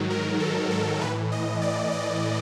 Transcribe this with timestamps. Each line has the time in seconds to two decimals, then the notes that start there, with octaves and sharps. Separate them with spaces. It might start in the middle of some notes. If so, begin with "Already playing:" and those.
Already playing: G#2 D#3 F#3
0.10 A#4
0.40 A4
0.71 A4
1.00 A2 E3 B4
1.32 D#5
1.61 D5
1.92 D#5